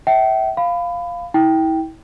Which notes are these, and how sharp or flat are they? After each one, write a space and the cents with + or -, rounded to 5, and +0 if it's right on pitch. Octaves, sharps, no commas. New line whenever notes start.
E5 -20 G5 -35
F5 +0 B5 +20
E4 -35 G5 +0